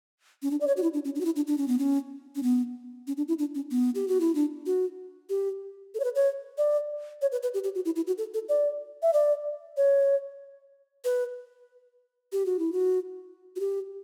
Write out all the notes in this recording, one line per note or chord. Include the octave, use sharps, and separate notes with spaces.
C#4
D4
D5
C#5
F#4
E4
D4
C#4
D4
F#4
E4
D4
D4
C#4
B3
C#4
C#4
B3
C#4
D4
E4
D4
C#4
B3
G4
F#4
E4
D4
F#4
G4
A4
C#5
B4
C#5
D5
C#5
B4
B4
G4
G4
F#4
E4
E4
F#4
A4
A4
D5
E5
D5
C#5
B4
G4
F#4
E4
F#4
F#4
G4